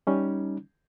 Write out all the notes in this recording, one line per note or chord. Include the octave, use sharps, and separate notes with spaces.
G3 C#4 D#4